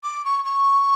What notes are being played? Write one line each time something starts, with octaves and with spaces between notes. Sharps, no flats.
D6
C#6
C#6